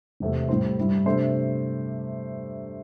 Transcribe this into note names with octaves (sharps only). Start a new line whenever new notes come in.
E1 E2 C3 A3
A2 G3 E4 C5
G2 G3 E4
C3 A3 D4 C5